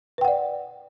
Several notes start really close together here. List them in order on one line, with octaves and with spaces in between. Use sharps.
B4 G5 F#5 D5